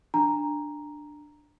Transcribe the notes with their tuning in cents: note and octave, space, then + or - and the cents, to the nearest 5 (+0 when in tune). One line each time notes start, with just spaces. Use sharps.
D4 +10 A#5 +0